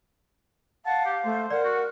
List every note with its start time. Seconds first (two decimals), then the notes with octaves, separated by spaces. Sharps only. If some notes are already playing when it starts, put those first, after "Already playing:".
0.86 F5 F#5 A5
1.05 G4
1.24 A3 C5
1.51 A#4 D5 F#5
1.64 F#4